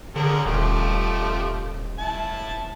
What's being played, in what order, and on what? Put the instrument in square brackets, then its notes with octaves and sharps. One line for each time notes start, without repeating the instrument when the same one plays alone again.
[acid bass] D3 [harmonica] C#4 G#4 A#4
[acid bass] D#1 [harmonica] F3 A3 G4
[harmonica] E4 A5